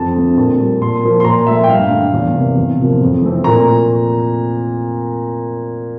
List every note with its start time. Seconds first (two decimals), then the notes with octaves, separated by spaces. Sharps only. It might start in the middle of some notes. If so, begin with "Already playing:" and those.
Already playing: F2 A5
0.15 D3 A3 C4
0.37 A#2 A5
0.59 G3 A#3
0.81 A#2 C6
1.03 F3 A#3
1.20 C6
1.25 A#2 A#5
1.47 F3 A3 E5
1.64 G5
1.68 G2 F5
1.91 D3 A3
2.14 E2
2.34 C3 E3 A#3
2.57 E2
2.79 C3 F3 A#3
3.01 F2
3.22 E3 A3 C4
3.44 A#2 A#5